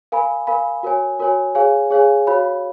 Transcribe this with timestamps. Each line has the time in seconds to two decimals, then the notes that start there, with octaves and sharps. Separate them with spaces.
0.12 A#4 F5 G#5 B5
0.47 A#4 F5 G#5 B5
0.83 F#4 A#4 C#5 G#5
1.19 F#4 A#4 C#5 G#5
1.55 G#4 C#5 F5 G#5
1.90 G#4 C#5 F5 G#5
2.27 F#4 C#5 F5 B5